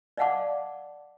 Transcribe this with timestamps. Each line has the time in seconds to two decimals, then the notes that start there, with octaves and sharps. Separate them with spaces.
0.17 D5 D#5 F5 F#5 A5 D6